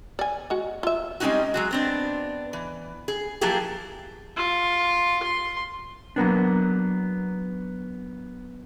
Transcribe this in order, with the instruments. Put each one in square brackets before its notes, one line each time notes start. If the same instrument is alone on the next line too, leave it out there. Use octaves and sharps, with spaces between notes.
[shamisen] D5 G#5
G#3 F#4
F4 E5
[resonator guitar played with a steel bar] G3 G#3 C4 C#4 D#4 F#4
F#3 G#3 F#4
B3 C4 D4
E3
G#4
F3 F#3 A#3 E4 G4 G#4
[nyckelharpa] F4
C6
[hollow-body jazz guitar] F#3 A#3 B3 D4